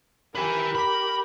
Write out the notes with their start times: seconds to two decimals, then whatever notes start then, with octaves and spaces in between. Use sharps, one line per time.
0.35 G4 A#4 B4 G#5
0.75 B5